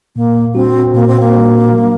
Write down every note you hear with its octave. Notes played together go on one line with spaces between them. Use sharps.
A#2 A#3
G3 C4 D4 F#4
A#2 A#3
C4
A#3
G3 D4 F#4
F#3